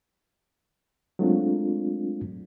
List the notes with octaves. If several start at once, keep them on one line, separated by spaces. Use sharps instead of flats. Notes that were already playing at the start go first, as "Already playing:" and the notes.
F#3 G#3 A3 C4 D4 F4